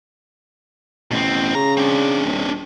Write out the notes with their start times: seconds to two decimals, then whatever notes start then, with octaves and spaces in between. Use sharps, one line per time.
1.11 A1 B2 C4
1.55 C#3 A#5
1.77 C4 D4
2.25 D#1